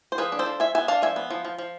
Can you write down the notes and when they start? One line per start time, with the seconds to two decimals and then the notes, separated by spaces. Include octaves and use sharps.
0.12 C5
0.18 F3 G#4 B4
0.32 D4
0.39 A4 C5
0.46 F3
0.60 F3 E5 G#5
0.75 B3 E5 G#5
0.88 D4 F5 A5
1.02 F3 E5 G#5
1.16 B3
1.30 F3
1.45 F3
1.59 F3